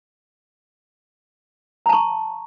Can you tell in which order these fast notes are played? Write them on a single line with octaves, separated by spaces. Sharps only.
A#5 A5 C#6